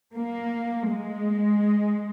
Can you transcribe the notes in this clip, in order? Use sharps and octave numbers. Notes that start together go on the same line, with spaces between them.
A#3
G#3